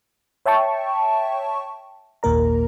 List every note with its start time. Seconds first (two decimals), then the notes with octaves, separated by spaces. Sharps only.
0.46 C#5 E5 G5 A5 C#6
2.23 G#1 D#2 A#2 A#3 A#4 A#5